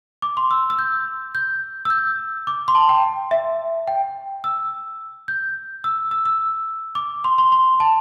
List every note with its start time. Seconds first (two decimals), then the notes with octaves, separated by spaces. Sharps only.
0.22 D6
0.37 C6
0.51 E6
0.70 E6
0.79 G6
1.35 G6
1.85 E6
1.90 G6
2.47 D6
2.68 C6
2.75 A5
2.89 G5
3.31 E5
3.88 G5
4.44 E6
5.28 G6
5.84 E6
6.11 E6
6.25 E6
6.95 D6
7.24 C6
7.38 C6
7.52 C6
7.80 A5